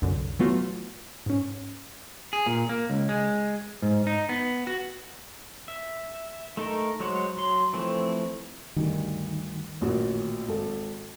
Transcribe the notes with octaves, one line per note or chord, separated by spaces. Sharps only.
C2 F#2 D3
E3 F#3 A3 B3 F4 F#4
G#2 C#4
G#4
A#2
A#3
C#2
G#3
G#2
D#4
B3
F#4
E5
A3 D#4 A4 A#4
F#3 G#3 C5 C#5 F#5
F#3 C6
E3 F3 A3 C4
D2 G2 D#3
A1 A#2 F#4
G#1 A4